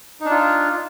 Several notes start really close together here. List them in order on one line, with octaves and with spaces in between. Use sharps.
D#4 D4 F4